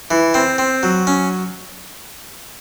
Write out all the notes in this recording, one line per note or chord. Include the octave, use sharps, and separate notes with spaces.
E3
C4
C4
F#3
C#4